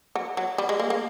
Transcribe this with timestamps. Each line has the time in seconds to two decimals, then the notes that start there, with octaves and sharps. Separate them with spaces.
0.15 F#3
0.37 F#3
0.58 G3
0.69 G#3
0.80 A#3
0.90 A#3